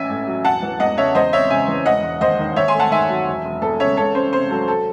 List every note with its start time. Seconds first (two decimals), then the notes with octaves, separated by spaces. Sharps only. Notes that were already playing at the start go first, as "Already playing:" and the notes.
Already playing: A1 C#4 E5 G#5
0.09 A2
0.27 F#3
0.44 E1 F#5 A5
0.62 E3
0.80 E2 D#5 F#5
0.97 C#3 C#5 E5
1.15 E2 C5 D#5
1.33 C4 C#5 E5
1.50 C#3 E5 G#5
1.68 E3
1.86 E1 D#5 F#5
2.03 E1
2.21 D#2 C5 D#5
2.39 D#3
2.56 D#2 C#5 E5
2.68 G#5 C6
2.74 A3
2.80 F#5 A5
2.91 D#3 E5 G#5
3.09 F#3
3.27 E1
3.44 E1
3.62 E2 A4
3.80 C#3 C#5 E5
3.97 C#2 A4 C#5
4.15 C#4 C5
4.33 C3 C5
4.50 F#3 A4
4.68 A4